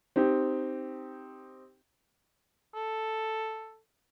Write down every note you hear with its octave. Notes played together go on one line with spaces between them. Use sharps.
C4 D#4 G4
A4